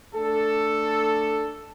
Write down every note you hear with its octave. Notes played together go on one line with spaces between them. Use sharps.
A3 D4 A4